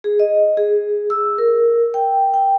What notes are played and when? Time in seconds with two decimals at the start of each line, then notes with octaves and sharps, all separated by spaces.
0.04 G#4
0.19 D#5
0.57 G#4
1.10 E6
1.38 A#4
1.94 G5
2.34 G5